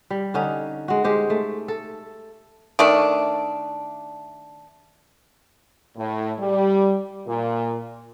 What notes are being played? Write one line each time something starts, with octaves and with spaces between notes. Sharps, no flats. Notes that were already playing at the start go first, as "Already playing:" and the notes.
G3
D3 C#4 D#4
G#3 F#4
G#3 G4 C5
A3
A4
D#3 A3 D4
A2
G3
A#2